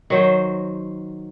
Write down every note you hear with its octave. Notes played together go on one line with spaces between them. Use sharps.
D#3 F#3 C5